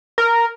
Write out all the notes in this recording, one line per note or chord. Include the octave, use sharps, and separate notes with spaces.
A#4